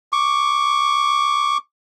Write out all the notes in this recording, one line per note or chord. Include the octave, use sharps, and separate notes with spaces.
C#6 D6